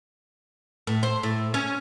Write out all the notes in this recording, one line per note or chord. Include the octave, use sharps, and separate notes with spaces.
A2
C5
A2
C#4